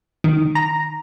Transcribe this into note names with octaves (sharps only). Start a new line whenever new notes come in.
D#3
A#5